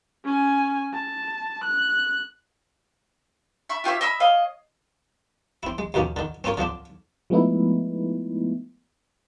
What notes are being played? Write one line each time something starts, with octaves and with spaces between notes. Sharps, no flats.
C#4 G#5
A5
F#6
E5 B5 C#6
F4 G4 C#5 E5
D#5 E5 B5 E6
C#5 D#5 F5
C4 E4
G#3
D#2 B2 D#3 F3 C#4
D3 D#3
C4 C#4 F4 A#4 C#5
D3 F3 C4 D4
F3 G#3 A3 B3 D#4 E4